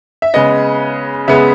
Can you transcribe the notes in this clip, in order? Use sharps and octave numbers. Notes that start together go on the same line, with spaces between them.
E5
C#3 G#3 B3 D#5
C#3 G#3 B3 E5